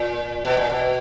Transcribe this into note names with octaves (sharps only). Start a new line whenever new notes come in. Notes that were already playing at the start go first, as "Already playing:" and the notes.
Already playing: A#2
B2
A#2
B2